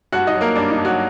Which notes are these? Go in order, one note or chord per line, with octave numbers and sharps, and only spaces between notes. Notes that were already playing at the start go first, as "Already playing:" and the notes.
G2 F#4 F#5
D#4 D#5
F#3
A#3 A#4
G2 D4
D#4
G2
F#3 F#4